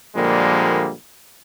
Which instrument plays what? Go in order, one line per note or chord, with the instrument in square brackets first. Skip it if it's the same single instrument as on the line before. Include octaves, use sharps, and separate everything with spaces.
[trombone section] A#2 D3 F3 G3 G#3 A#3